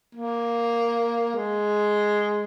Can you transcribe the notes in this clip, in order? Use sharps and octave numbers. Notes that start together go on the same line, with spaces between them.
A#3
G#3